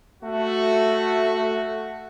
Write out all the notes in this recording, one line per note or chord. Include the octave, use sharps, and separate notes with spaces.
A3 F#4